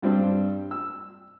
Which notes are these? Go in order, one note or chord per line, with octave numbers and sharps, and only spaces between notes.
G2 G3 C4 D4 G4
E6